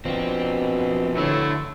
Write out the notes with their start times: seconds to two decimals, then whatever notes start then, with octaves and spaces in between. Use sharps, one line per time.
0.05 B2 F3 C4 D4
1.17 D3 A3 E4 C#5